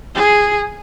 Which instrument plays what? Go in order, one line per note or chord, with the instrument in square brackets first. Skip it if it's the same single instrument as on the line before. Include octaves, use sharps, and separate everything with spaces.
[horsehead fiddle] G#4